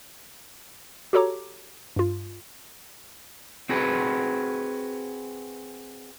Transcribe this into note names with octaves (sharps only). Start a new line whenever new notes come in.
F#4 G4 A4 C#5 A#5 D6
G2 F4
C4 F#4 G#4 B4